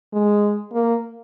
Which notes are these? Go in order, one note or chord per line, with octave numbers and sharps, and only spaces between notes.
G#3
A#3